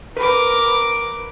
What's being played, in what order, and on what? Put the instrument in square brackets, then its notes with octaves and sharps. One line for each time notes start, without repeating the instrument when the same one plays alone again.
[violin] A#4 D6 [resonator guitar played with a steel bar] B4